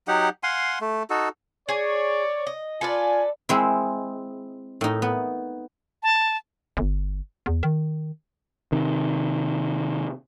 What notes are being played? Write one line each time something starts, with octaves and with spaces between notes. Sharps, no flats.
F#3 D#4 G4 F#5
F5 F#5 G#5 C6
A3
D#4 F#4 A4
G#4 C#5 D5 G#5
D#5
F4 A4 B4 D5 G#5
G#3 C4 E4
A2 D#4
B3
A5
G1
E2
D#3
C3 D#3